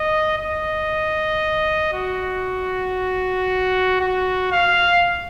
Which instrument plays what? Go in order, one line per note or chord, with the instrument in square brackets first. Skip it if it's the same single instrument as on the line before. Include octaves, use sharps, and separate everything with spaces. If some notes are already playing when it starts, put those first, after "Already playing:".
Already playing: [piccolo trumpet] D#5
D#5
F#4
F#4
F5